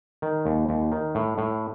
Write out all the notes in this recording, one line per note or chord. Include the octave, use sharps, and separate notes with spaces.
D#3
D#2
D#2
D#3
A2
A2